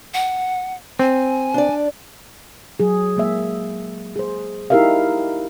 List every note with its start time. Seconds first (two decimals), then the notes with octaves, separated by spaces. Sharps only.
0.14 F#5
0.99 C4 G#5
1.54 D4 D5
2.80 F#3 G#4
3.17 G#3 A#3 E5
4.16 G#4 C5
4.70 D#4 E4 G4 A#4 E5 F5